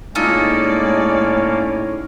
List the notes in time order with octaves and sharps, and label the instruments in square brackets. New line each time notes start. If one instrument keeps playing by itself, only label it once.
[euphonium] A2 [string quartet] G#3 D5 [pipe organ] A#3 C#4 [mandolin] D#4 F4 A4